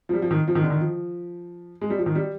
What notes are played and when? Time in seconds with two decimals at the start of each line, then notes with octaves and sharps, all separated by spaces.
0.09 F3
0.14 G3
0.22 F3
0.31 D#3
0.48 F3
0.55 D#3
0.63 D3
0.70 D#3
0.81 F3
1.81 G#3
1.90 G3
1.98 F3
2.06 D#3
2.15 G3